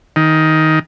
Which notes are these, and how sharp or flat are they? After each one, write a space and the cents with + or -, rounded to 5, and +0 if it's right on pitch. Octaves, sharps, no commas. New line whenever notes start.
D#3 +15